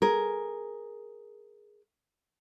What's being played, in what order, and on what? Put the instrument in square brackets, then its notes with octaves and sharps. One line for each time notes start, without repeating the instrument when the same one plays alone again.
[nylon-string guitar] G#4 A#4